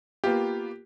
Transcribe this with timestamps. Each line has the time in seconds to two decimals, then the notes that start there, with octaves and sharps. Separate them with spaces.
0.24 A#3 B3 F4 G4